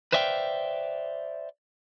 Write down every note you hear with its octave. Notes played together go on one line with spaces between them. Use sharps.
B4 C5 D5 E5 F5 G5